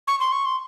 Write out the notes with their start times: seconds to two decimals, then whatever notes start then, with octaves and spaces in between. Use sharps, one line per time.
0.08 C#6
0.20 C6
0.32 C#6
0.45 C6